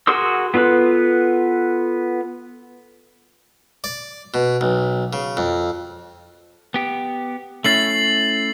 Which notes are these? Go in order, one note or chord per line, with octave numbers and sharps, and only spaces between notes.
F#4 G#4 A#4 C6 E6
B3 F4 A4 B4
D5
B2
B1
C#3
F2
B3 G4
A3 C#4 E4 A6 C7 F#7